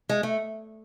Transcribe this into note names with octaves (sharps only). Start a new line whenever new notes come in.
G#3
A3